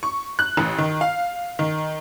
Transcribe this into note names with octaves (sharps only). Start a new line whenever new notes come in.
C#6
F#6
A1
D#3
F5
D#3